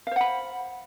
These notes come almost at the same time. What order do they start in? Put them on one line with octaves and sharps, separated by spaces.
F5 C5 F#5 B5